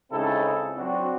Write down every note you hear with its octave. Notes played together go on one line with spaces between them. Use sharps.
C#2 C#3 C4 D#4 E4 A4
F#3 C4 D4 F#4